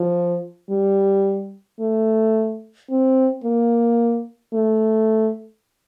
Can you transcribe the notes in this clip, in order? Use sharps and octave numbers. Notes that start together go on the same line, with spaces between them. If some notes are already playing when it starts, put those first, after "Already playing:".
Already playing: F3
G3
A3
C4
A#3
A3